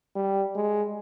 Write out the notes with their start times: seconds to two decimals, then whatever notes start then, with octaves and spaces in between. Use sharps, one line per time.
0.15 G3
0.55 G#3